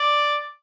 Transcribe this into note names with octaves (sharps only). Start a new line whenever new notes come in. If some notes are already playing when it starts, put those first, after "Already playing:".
Already playing: D5